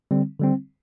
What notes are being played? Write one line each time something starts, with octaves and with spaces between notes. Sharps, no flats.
D3 G3 C4
D3 G3 C4